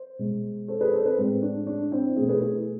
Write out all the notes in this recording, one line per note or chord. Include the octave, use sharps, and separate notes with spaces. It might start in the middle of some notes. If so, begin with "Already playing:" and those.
Already playing: C5
B2 G#3
A4 C5
G#4 B4
A4 C5
G#4 B4
A2 G#3 C4
D4
D4
C4 E4
B2 A3 E4 G#4
G#4 B4
E4 G#4